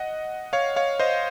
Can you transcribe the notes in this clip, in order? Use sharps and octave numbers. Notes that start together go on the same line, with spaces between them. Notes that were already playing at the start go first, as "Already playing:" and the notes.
Already playing: D#5 F#5
C#5 F5
C#5 F5
C5 D#5